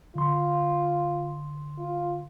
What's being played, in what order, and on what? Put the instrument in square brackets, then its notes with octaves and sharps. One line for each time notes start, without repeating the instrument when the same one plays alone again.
[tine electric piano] D3 C6 [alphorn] F4
[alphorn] F4